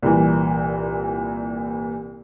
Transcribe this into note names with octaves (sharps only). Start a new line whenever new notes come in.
C2 A#2 E3